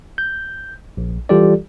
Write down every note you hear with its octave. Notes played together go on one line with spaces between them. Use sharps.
G6
A#1
E3 G3 F4 G4 A4 D5